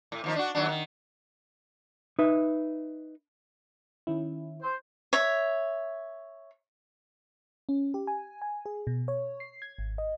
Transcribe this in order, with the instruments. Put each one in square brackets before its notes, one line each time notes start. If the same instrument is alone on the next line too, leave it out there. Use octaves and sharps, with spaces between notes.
[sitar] A2
D#2 F3 D#4
D4 F#4
D#2 F#3 D4
D#3
[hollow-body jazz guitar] D#4 B4 E5
[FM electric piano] D#3 C#4 E4
[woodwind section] C5
[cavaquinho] C#5 E5
[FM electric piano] C#4
G4
G#5
G#5
G#4
B2
C#5
C7
G#6
G#1
D#5